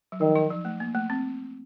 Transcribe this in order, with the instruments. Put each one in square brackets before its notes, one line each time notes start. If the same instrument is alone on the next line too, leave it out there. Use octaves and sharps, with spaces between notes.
[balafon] F#3
[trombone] D#3 [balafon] F3
[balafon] D#4
F3
A3
A#3
A3
C4